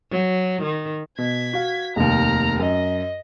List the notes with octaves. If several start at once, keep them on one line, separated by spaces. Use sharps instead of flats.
F#3
D#3
B2 G#6 B6
F#4 F5
F1 D#2 A#5 F6
F#2 D#5